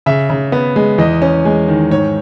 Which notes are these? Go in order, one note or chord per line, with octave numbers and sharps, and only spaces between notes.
C#3 E5
C#3
B3
G#3
E2 D#5
C#4
G#3
D#3
G#2 C#5